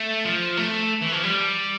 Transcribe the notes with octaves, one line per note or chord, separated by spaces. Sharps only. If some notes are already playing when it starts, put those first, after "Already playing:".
Already playing: A3
F3
A3
E3
F3
G3